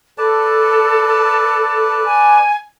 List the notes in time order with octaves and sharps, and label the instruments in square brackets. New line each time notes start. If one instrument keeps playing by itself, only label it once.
[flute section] A4 [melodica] B4 D5 A5
[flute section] G#5